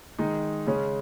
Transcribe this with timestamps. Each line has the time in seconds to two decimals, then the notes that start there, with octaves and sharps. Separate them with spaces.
0.18 D#3 G#3 D#4
0.67 C#3 G#3 C#4